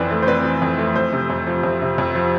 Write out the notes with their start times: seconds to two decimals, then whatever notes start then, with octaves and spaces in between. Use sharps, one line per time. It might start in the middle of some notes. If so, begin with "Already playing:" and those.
Already playing: F2 E3 C4 B4 C5 D5 E5
0.11 A3
0.22 C5
0.27 C4 B4 D5
0.44 E3
0.62 F2
0.78 A3
0.96 F2 C5
1.13 C3
1.30 F2
1.47 F3
1.63 F2
1.82 C3
1.98 F2
2.15 F3